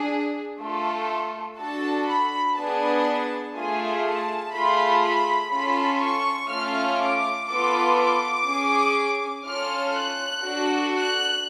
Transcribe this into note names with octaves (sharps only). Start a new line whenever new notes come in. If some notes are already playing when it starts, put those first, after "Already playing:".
Already playing: D4 G#4
A3 F4 A4
D4 F#4 A4 A5
B5
B3 D4 G#4 A5
A3 F4 G#4 G#5
A5
A3 F4 G#4 B5
B5
C#4 F4 A4 B5
C#6
A3 C#4 F4 F6
D6
B3 F4 A4 D6
D6
C#4 G#4
C#4 F4 A4 F6
F#6
D4 F#4 A4
F#6